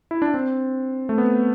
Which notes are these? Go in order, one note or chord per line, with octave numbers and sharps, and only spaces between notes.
E4
D4
C4
A3
B3